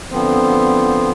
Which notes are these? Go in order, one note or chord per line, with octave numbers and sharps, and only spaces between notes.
D3 F3 B3 C4 C5